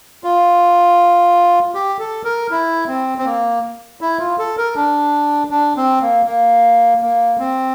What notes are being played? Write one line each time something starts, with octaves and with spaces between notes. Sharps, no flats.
F4
G4
A4
A#4
E4
C4
C4
A#3
E4
F4
A4
A#4
D4
D4
C4
A#3
A#3
A#3
C4